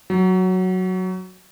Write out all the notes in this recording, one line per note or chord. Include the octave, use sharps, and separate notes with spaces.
F#3